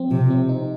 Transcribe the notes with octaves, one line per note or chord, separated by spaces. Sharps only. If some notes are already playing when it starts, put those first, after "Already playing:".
Already playing: F3 C4
C3 F3
C4
D#4